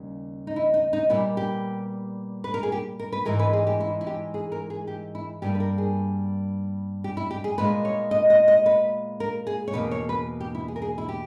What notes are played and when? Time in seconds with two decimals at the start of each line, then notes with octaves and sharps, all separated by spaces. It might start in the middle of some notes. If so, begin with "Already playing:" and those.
Already playing: D#2 C#3 G3
0.47 D#4
0.56 E4
0.74 D#4
0.93 D#4
1.10 A#2 G3 B3 E4
1.37 G4
2.44 B4
2.54 A#4
2.63 G#4
2.72 G4
2.99 A#4
3.12 B4
3.25 G#2 E3 G#3 A#4
3.39 B4
3.53 G#4
3.67 G4
3.80 E4
4.01 E4
4.07 G4
4.34 G#4
4.52 A#4
4.70 G#4
4.87 G4
5.15 E4
5.42 G2 G3 A#3 G4
5.55 B4
5.60 A#4
5.78 G#4
7.04 G4
7.17 E4
7.31 G4
7.44 G#4
7.58 A#2 G#3 B3 B4
7.85 C#5
8.11 D#5
8.30 D#5
8.48 D#5
8.66 B4
9.20 A#4
9.47 G#4
9.68 C#5
9.73 E2 B2 A#3 B4
9.91 C#5
10.09 B4
10.40 G4
10.55 E4
10.68 G#4
10.76 A#4
10.82 G#4
10.98 E4
11.09 G4